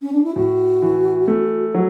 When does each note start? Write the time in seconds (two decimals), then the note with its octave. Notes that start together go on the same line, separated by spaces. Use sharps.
0.02 C#4
0.13 D4
0.24 E4
0.36 A2 F#4
0.82 E3
1.28 A3
1.74 F#3